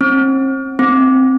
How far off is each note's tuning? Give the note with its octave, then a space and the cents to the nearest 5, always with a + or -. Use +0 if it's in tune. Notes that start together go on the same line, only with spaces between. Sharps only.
C4 +40
C4 +0